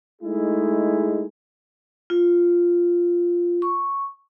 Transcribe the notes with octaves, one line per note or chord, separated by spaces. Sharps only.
G#3 A3 D#4 E4 G#4
F4
C#6